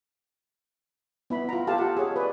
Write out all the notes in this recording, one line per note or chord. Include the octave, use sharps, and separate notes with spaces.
B3 E4 B5
F4 A#5
F4 G4 A4 F5 A5
F#5
G#4 C#5
B4 D5